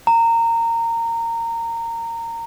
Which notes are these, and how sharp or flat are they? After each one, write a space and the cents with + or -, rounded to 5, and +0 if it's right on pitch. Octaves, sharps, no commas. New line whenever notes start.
A#5 -20